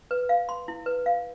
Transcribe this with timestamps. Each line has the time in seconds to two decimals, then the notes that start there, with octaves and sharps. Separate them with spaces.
0.11 B4
0.29 F5
0.49 C6
0.68 E4
0.86 B4
1.06 F5